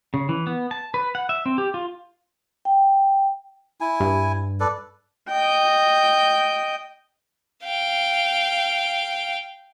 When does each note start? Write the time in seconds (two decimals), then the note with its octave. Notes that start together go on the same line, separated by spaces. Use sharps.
0.14 C#3
0.29 E3
0.47 B3
0.71 A5
0.94 B4
1.15 F#5
1.29 E5
1.46 C4
1.58 G4
1.74 F4
2.65 G5
3.81 E4 G#5
4.00 G2
4.60 A4 B4 D5
5.29 D#5 G5
7.65 F5 G5